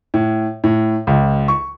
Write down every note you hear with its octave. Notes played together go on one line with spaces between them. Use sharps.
A2
A2
C#2
C#6